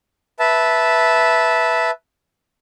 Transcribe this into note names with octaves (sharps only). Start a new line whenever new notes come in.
B4 E5 A5